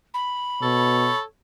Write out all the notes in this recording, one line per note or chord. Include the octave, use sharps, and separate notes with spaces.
B5
B2 A4 C#5